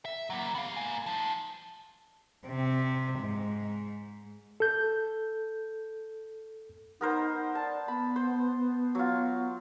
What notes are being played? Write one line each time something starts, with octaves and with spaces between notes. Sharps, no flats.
E5
F#3 A#3
B3 F5
G#3 A#3
F3 D#4
C3
G#2
A4 G6
B3 D#4 A#4 C5
D5 A5
B3 B5
C5
F#3 F4